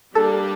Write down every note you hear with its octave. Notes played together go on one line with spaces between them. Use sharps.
G3 A#3 D4 G4 A4